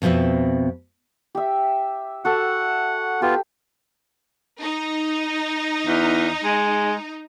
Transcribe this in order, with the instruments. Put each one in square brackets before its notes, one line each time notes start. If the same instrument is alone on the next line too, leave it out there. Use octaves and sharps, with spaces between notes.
[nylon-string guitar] F2 B2 C4 B4 E5
[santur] G4 E5
[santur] F#4 A4 [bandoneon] F#5
[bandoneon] B3 F4 [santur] G4
[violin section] D#4
[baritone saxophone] E2
G#3